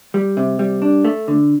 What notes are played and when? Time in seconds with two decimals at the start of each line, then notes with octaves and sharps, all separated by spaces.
0.14 G3
0.37 C3
0.59 G3
0.82 D4
1.05 A3
1.28 D3